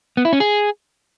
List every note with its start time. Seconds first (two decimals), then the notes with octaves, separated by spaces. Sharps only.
0.17 B3
0.25 E4
0.33 C#4
0.40 G#4